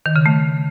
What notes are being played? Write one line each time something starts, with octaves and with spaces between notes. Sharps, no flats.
D#3
C#3
A3